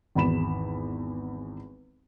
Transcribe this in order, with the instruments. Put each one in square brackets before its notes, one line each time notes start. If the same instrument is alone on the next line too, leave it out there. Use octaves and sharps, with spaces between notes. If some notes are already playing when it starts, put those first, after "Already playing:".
[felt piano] G#1 E2 B5 E7